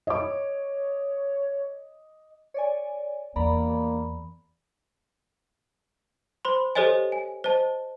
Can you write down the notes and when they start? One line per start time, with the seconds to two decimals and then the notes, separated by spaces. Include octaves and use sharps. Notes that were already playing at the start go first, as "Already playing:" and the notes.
0.07 C#5 D#5 D6
2.54 C#5 D5 G#5
3.36 E2 A#3 D5 A#5 B5
6.45 C5 B5 C6
6.75 G4 A4 C5 C#5 D#5 G#5
7.12 G#5
7.44 C5 D#5 A5